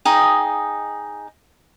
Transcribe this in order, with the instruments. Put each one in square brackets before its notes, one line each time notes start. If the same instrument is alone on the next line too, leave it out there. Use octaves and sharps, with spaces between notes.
[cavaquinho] D#4 G#4 D#5 G5